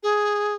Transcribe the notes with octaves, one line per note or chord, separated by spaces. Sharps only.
G#4